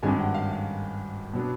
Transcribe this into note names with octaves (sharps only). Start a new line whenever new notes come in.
G#1 G2 D#3 G#3 C#4 G#5
F#5
F5
F5
B2 F#3 B3 D4